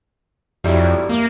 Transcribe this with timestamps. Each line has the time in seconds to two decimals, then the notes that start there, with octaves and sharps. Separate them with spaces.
0.64 F2 F#3 G3 E4
1.09 A#3